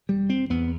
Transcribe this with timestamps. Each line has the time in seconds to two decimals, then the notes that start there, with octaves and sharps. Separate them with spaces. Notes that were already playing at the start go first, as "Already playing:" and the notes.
0.09 E1 G3
0.30 C4
0.50 E2 B3